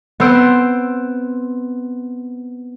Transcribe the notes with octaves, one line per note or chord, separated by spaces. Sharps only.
B3 C4 C5 E6 D7